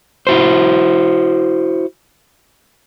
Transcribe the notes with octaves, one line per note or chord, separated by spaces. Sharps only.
E4 F#4 C5